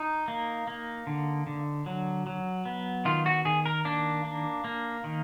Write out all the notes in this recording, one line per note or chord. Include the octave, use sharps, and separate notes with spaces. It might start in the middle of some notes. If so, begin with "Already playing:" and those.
Already playing: D#4
A#3
A#3
D3
D3
F#3
F#3
B3
D#3 F4
F#4
D#3 G#4
A#4
A#3 D4
A#3
A#3
D#3